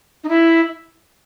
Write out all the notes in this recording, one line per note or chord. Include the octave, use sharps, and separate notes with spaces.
D#4
E4